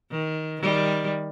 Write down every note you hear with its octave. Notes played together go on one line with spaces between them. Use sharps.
D#3
D#3 G3